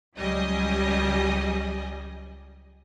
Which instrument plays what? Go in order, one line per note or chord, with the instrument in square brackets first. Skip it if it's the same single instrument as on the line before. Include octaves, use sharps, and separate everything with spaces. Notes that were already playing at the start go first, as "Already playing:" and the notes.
[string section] C#2 F#3 G3 G4 D#5 G#5